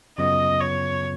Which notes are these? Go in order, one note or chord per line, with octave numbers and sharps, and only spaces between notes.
F#2 C#3 F#3 B3 F4 D#5
C#5